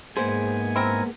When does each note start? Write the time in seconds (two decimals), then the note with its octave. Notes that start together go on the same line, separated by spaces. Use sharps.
0.17 G#2 G#3 A#3 B3 G#4 C5 G#5
0.76 C4 E4 A#4